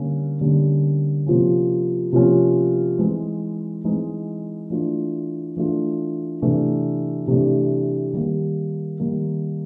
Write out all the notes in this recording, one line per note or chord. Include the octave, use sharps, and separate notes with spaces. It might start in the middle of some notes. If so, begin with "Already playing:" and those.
Already playing: D3 G3 A#3 C#4
D3 G3 A#3 C#4
C3 F3 A#3 C#4
C3 F3 A#3 C#4
E3 G#3 C4 D#4
E3 G#3 C4 D#4
E3 A3 D4 F4
E3 A3 D4 F4
C3 E3 A3 D4
C3 E3 A3 D4
D#3 G3 A#3
D#3 G3 A#3